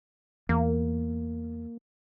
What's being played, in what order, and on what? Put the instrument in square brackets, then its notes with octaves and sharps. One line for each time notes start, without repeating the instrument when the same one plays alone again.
[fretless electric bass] E2 [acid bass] A#3